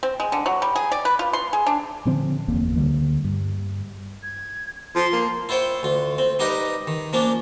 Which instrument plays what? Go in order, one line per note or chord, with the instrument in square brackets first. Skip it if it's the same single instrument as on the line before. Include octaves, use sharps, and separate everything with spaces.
[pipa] C4
G#3
D3
F#3
G3
G#4
D5
B4
F4
C6
G#4
D4
[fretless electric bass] A#2 D3 F3 C4
F#1 E2 A#3
D2 D3 G3 A#3
G2
[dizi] G#6
[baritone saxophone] F3 [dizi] C6
[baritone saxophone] A#3
[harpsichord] E4 F4 C5 C#5 G5
D2 F4
C4
G3 D#4 G4 A#4 B4 D#5
D#3
F3 A#3 C#4 D4 F4